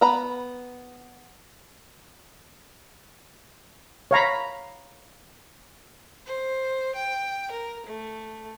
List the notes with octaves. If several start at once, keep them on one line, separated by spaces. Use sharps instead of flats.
B3 A#5 B5
C#5 F5 A#5 B5
C5
G5
A#4
A3